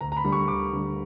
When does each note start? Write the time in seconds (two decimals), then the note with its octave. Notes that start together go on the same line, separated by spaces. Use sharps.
0.01 D2 A#5
0.12 A#5
0.17 B5
0.24 D3 G3
0.32 C#6
0.48 D2 D6
0.72 D3 G3